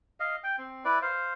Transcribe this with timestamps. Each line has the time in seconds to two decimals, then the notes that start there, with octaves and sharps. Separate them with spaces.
0.20 D#5 F5
0.44 G5
0.58 C4
0.85 E4 B4 D5
1.02 C5 F5